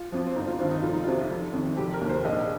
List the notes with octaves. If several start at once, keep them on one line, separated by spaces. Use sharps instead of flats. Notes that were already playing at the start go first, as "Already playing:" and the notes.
Already playing: F4
F2 F3
C4
G1 D#4
F4
G2 D#3 C4
D#4
F1 F4
D#4
F2 C3 F3 F4
F1
F2 D#3
F1 G4
A#4
D#2 D#3
C5
A#1 D#5